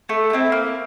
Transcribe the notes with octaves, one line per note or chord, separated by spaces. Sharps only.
A3
G4
C4 E4
A#3